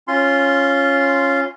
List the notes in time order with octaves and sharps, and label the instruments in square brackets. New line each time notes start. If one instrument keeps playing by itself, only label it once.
[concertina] C#4 F4 C6